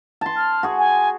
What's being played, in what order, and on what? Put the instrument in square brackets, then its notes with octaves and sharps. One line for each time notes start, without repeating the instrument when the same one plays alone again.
[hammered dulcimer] A5 C6
[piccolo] F6
[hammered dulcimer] F#4 G#4
[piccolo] G#5